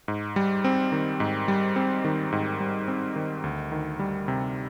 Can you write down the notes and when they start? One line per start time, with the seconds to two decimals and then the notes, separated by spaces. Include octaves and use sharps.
0.08 G#2
0.36 G3
0.64 C4
0.92 D#3
1.20 G#2
1.48 G3
1.76 C4
2.05 D#3
2.32 G#2
2.60 G3
2.88 C4
3.16 D#3
3.44 D2
3.72 D#3
3.99 G3
4.28 C3